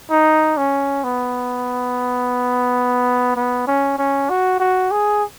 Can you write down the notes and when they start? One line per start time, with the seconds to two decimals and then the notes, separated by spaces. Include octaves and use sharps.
0.11 D#4
0.57 C#4
1.04 B3
3.36 B3
3.67 C#4
3.99 C#4
4.30 F#4
4.60 F#4
4.91 G#4